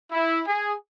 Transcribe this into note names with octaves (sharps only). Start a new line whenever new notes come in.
E4
G#4